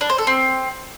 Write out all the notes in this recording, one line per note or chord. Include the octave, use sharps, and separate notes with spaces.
D4
C5
A4
C4